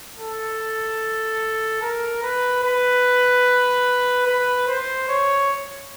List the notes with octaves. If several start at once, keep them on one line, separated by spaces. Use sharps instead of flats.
A4
A#4
B4
B4
B4
C5
C#5